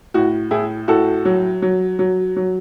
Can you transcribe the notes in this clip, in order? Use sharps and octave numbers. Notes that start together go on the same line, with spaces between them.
A2 F#4
A2 E4 G#4
A2 F#4 A4
F#3
F#3
F#3
F#3